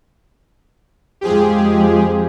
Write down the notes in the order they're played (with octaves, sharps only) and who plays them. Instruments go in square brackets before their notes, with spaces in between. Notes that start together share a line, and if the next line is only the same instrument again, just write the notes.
[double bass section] F2 F3 G#3 [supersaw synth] G4 G#4